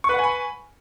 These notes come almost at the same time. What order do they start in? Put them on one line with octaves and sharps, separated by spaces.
C#6 B4 F#5 G#5 B5